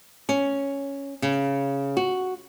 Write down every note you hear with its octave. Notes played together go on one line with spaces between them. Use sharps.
C#4
C#3
F#4